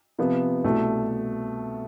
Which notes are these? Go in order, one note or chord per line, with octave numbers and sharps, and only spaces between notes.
C3 F3 B3
C2 B2 A3